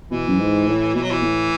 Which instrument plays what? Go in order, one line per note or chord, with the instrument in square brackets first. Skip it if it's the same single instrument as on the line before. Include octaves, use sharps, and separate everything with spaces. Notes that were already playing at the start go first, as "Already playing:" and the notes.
[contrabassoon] B2 [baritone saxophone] E3
[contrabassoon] F#2
G#2
A2
[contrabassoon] B2 [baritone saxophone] E3
[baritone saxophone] F#3
E3
[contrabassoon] A2